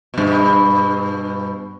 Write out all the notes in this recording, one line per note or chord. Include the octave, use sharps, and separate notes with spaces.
G2 B2